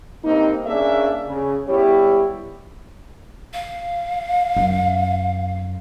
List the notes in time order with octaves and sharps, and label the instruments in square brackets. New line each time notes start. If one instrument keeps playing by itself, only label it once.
[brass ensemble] G2 A#3 C4 D#4
A#3 C#4 D4 G#4 D5 E5
C#3
G3 B3 E4 G4 C#5
[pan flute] F5
[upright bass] F#2